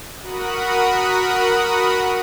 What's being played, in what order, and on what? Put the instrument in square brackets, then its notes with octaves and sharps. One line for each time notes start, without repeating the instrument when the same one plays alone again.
[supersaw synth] F#4 A#4 F#5 B5 D#6